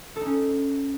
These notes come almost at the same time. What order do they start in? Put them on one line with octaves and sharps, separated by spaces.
A4 D#4 C#4